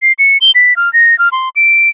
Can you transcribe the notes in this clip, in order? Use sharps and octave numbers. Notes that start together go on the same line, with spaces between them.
C7
C#7
G7
B6
F6
A#6
F6
C6
D7